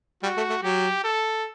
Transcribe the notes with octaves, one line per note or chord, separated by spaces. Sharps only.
G3 F#4
A3
A3
F#3 G4
A4